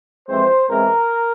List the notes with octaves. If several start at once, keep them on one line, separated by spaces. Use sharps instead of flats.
F2 E3 G#3 C4 C5
E2 E3 G#3 C4 A#4